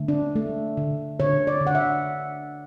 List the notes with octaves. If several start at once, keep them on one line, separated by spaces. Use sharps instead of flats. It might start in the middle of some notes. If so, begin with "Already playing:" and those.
Already playing: D3 A3
D4
A3
D3
D3 C#5
D5
D3
F#5
E5